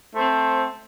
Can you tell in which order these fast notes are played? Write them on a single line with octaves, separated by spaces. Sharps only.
A3 C5 C4